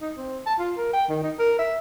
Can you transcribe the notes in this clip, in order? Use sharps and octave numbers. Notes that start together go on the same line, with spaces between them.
D#4
C4
A5
F4
A#4
G5
D#3
D#4
A#4
E5